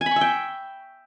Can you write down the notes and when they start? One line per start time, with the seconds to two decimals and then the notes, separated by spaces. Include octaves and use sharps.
0.01 G#5
0.06 B5
0.11 C#6
0.16 E5
0.21 G5